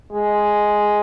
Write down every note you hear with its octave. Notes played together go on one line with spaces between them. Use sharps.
G#3